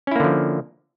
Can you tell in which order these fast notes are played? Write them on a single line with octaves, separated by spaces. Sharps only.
C#4 E4 A#3 D3 F3